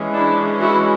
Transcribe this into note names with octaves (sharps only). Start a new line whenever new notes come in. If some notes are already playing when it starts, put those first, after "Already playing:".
Already playing: E3 G#3 C#4
D4 E4
E4 F#4